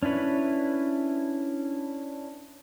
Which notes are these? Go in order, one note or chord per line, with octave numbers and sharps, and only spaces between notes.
C#4 D4 E4 B4 C#5